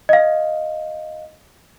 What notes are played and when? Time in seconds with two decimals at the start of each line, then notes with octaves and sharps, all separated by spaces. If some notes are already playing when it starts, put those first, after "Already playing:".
0.09 D#5 F5